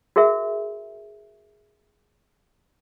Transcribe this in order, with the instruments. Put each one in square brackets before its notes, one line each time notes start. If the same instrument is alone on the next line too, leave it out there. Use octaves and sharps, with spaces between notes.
[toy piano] F#4 G#4 A#4 E5